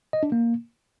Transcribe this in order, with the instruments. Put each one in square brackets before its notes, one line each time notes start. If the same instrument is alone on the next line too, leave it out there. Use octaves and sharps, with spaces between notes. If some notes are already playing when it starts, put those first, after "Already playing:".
[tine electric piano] D#5
D4
A#3